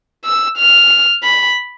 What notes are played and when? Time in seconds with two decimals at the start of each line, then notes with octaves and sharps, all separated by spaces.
0.25 E6
0.58 F6
1.24 B5